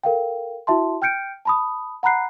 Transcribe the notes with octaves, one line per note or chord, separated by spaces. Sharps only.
A4 A#4 F5 G5
E4 F#4 E5 A5 C6
G5 F6 G6 C#7 D7
A5 B5 D#6
F#5 A#5 B5 F#6 C7